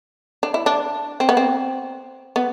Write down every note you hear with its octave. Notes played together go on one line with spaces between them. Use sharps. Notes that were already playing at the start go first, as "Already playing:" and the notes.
D4
E4
D4
C4
B3
C4
B3